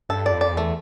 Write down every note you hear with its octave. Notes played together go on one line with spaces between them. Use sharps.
G2 A4
F2 D5
D5
E2
A3